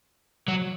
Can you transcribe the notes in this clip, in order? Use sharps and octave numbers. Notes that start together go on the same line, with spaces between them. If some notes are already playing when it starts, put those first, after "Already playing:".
F#3